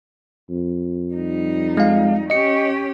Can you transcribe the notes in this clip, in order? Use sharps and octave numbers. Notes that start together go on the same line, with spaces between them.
F2
G3 D#4
G#3 F5
C#4 G4 D#5 C#7